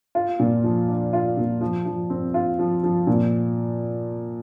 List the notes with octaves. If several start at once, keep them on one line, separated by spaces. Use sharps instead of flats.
F4
A#2
F3
D4
F4
A#2
F3
F3
C4
F4
F3
F3
A#2